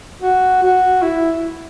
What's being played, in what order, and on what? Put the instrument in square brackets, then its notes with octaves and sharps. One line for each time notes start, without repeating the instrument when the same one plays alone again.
[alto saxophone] F#4
F#4
E4